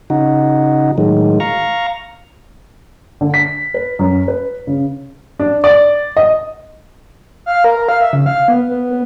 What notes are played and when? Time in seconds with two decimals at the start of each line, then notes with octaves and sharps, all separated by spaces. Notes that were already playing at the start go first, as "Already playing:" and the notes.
0.10 C#3 D#4 F#4
0.98 A2 D#3 F#3 G#3
1.40 F5 A#5 C#6
3.21 D3
3.34 B6
3.74 B4
3.99 F#2
4.28 B4
4.67 C#3
5.40 D4
5.64 D5
6.17 D#5
7.46 F5
7.64 A#4
7.77 A#4
7.89 F5
8.01 E5
8.13 C#3
8.26 F5
8.48 B3
8.68 B3
8.90 B3